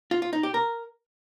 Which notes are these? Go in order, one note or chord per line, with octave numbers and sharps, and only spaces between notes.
F4
F4
D#4
G4
A#4